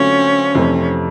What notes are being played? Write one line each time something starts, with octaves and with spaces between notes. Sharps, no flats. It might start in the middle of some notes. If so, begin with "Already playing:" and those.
Already playing: D3 F#3 A3 C4 C#4 F4
F2 C3 E3 A3 C4